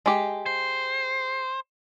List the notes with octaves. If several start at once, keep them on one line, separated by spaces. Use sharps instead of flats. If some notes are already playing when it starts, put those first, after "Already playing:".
G#3 G4
C5